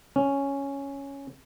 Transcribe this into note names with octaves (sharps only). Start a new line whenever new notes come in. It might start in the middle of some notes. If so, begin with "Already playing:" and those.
C#4